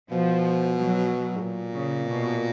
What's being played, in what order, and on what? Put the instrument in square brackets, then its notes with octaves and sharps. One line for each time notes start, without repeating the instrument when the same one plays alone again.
[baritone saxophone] B2 [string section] F3
[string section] F#3
[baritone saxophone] G#2
A#2
[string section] C#3
B2